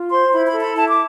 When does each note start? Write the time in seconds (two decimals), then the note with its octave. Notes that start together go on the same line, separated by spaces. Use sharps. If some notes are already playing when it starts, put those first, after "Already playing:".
Already playing: F4
0.10 C5 C6
0.32 E4 B5
0.46 B5
0.53 A4
0.60 B5
0.74 E4 A5
0.88 D6